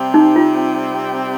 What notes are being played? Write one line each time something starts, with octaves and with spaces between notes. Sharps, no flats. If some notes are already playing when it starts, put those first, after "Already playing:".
Already playing: C3 G3 C4
D#4
F4